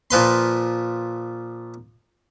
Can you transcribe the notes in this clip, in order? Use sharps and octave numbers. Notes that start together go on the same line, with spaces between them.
A#2 F3 B4 C6